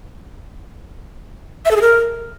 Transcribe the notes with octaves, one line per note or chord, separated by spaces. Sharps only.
E5
A4
G#4
A#4